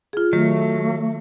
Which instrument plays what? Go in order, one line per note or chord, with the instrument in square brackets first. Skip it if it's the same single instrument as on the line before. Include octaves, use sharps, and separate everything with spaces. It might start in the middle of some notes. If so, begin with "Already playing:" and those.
[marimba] F4 G#4
[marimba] D#3 [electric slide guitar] F#3 [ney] A3